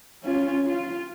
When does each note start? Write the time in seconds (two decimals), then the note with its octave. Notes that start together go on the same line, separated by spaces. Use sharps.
0.23 C#4 F4
0.66 F4